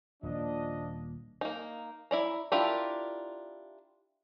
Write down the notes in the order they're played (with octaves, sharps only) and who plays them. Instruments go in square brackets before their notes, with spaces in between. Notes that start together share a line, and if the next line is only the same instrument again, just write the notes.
[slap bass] D#1 A#3 [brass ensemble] F3 D4 D#5
[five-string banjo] A#3 D#4
E4 D5 A#5
D4 E4 F4 G4 A#4